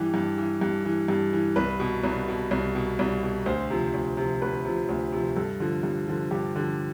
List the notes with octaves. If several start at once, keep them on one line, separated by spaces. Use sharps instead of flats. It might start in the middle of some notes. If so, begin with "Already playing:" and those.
Already playing: G2 E3 G4
G2
E3
G2
E3
G2
E3
C2 B4
B2
C2
B2
C2
B2
C2
B2
D2 C5
C3 F3
D2
C3 F3
D2 B4
C3 F3
D2
C3 F3
G2 A4
D3 F3
G2
D3 F3
G2 G4
D3 F3